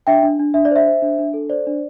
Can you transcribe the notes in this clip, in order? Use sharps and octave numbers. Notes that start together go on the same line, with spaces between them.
D4 E5 G5
D4
D4
D4 E5
D5
C5 E5
C5
D4
D4
A4
C5 D5
D4